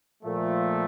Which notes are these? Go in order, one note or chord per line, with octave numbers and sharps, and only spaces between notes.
A#2 F3 A3